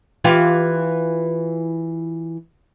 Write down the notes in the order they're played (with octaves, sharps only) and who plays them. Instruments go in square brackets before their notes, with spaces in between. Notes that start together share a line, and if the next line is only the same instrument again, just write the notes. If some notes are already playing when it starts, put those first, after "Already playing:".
[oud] E3 F4 G4